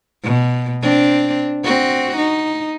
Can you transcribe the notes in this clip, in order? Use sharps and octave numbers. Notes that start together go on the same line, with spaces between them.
B2
C4 D4
C4 F#4
D#4